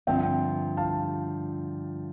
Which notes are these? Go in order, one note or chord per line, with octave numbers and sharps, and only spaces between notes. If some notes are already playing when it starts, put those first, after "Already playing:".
G2 D3 F3 C4 E5 G5
F5 A5